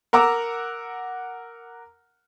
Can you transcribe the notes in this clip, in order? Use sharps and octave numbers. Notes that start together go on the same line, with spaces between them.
A#4 F#5 A#5 D6 E6